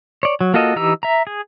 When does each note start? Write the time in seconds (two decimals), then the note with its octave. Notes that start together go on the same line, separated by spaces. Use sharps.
0.23 C#5 D5
0.41 F#3
0.54 A#3 F4 F#4 A4 D#5
0.76 E3 D#4 G4 A#5 E6
1.03 E5 A#5
1.27 G#4